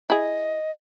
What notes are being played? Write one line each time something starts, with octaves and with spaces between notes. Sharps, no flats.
E4 G#4 D#5